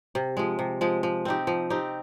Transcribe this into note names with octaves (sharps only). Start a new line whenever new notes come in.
C3
F3 G#3
C3
F3 G#3
F3
C4 D#4 G4
F3
C4 D#4 G4